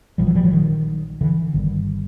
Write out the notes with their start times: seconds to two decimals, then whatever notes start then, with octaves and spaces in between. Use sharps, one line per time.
0.18 A#1 A#2 F3 G3
0.26 E3 F#3
0.35 F3 G3
0.44 E3 F#3
0.53 D#3
1.21 D3 E3
1.54 G1 G2 D3 D#3